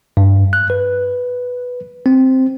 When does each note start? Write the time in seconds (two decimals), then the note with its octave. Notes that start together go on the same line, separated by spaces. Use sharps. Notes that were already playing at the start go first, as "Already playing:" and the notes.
0.17 G2
0.53 F#6
0.70 B4
2.06 C4